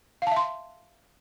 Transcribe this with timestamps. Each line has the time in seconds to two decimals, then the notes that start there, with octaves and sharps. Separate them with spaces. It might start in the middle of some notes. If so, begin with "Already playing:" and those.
0.22 F5
0.27 A5
0.32 E5
0.36 C6